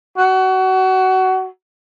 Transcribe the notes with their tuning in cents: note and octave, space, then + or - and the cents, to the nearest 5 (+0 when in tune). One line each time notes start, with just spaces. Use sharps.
F#4 +25